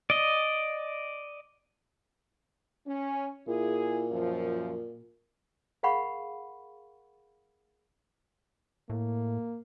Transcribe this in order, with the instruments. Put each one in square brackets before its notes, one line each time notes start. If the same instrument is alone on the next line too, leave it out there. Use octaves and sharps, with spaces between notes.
[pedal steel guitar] D5 D#5
[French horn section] C#4
[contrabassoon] A#2 [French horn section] E4 G#4
[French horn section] F#2 F3
[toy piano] G#4 A#4 F5 F#5 B5 C#6
[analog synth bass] A2 [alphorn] A#3